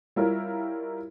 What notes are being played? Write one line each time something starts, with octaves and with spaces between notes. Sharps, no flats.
G3 E4 F4 A#4 C#5